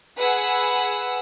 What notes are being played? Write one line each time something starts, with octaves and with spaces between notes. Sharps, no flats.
G#4 B4 F#5 E6